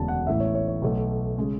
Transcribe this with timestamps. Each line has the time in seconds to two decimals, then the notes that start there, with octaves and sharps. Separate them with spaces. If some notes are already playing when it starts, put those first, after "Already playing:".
Already playing: E1 D2 C#3 A5
0.08 F#5
0.27 A1 A2 E3 E5
0.40 C#5
0.55 C#5
0.68 C#5
0.82 B1 B2 A3
1.38 C#3 G#3